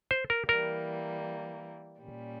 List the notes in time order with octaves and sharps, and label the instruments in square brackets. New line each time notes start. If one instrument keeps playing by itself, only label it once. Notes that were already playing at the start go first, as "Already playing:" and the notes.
[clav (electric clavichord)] C5
A#4
[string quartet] E3 G3 A#3 [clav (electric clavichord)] A#4
[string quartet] A#2 G3 C#4